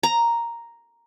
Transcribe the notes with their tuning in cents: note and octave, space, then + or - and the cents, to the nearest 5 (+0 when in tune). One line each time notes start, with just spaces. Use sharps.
A#5 +0